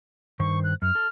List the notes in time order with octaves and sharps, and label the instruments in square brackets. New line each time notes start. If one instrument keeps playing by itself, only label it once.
[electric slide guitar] G2 D#3 C5 [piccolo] C#6
[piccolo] F#6
[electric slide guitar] F#2 [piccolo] F6
[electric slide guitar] A4